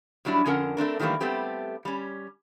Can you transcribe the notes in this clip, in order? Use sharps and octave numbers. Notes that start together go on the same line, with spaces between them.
A2 F#3 G3 D4 E4
F2 D3 C#4 A#4 F#5
A3 C4 D4 A#4
D#3 E3 G3 A3 A#3
G3 A3 B3 C4 G4
G3 C#4